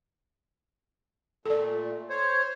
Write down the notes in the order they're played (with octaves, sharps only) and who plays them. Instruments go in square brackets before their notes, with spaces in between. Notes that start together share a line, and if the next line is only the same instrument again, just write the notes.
[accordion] A#2 A3 [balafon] A4 D5
[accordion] C5 C#5